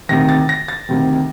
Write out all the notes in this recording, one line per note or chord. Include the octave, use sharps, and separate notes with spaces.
D2 C3 D#3 A#6
A6
A#6
A6
D2 C3 D#3